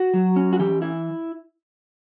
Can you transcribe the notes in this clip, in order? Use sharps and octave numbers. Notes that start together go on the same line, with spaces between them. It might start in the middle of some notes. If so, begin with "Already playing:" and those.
Already playing: F#4
F#3
C#4
F#4
E3 G4
E4